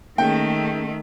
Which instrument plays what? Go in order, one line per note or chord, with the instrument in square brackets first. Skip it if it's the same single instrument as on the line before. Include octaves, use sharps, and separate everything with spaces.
[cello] D#3 A3 [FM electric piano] A#3 C#4 G#4 [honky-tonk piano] G5